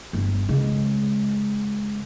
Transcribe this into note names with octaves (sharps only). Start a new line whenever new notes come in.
G1
C#3 G#3